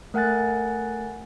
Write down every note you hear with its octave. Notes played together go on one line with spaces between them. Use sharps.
A3 A#4 F#5 G#5 F#6 A6